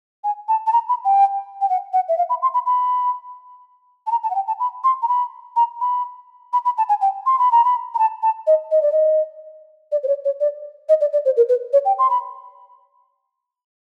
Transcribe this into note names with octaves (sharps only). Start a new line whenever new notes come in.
G#5
A5
A5
A#5
B5
G5
G5
F#5
F#5
E5
F5
B5
C6
B5
B5
A5
A#5
A5
F#5
G5
A5
B5
C6
A#5
B5
A#5
B5
B5
B5
A5
G#5
G5
C6
B5
A#5
B5
A#5
A5
A5
D#5
D#5
D5
D#5
D5
C5
C#5
C#5
D5
D#5
D5
D5
C5
A#4
B4
C#5
G5
C6
B5